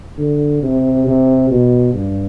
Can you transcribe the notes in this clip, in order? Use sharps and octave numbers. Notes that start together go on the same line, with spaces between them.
D3
C3
C3
B2
G2